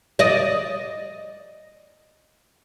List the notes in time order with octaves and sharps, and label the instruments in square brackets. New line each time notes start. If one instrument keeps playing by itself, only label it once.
[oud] D5 D#5